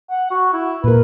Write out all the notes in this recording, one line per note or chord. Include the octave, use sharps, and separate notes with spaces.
F#5
F#4
E4
A#2 A#4 B4